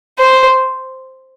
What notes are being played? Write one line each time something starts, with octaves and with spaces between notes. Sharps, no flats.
C5